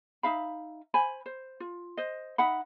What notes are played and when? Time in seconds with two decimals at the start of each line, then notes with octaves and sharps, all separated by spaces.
0.23 D#4 E5 F5 B5
0.94 C5 G#5 B5
1.26 C5
1.60 F4
1.97 C5 D#5
2.38 D#4 E5 F#5 B5